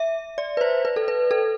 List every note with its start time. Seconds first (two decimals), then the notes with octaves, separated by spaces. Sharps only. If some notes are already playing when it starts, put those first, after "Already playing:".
Already playing: E5
0.38 D5
0.57 B4
0.61 C5
0.85 B4
0.96 A4
1.08 B4
1.31 A4